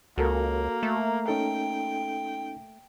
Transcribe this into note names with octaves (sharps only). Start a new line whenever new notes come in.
C#2 A#3 F#4 A4 A#4
A3
C#4 D#4 A4 G5